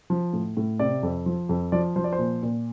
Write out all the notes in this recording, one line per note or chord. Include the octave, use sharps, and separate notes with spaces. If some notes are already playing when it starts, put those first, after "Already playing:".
F3
A2
A2
C3 D5
F2
F3
F2
F3 D5
F3 C5
D5
C5
A#2
A#2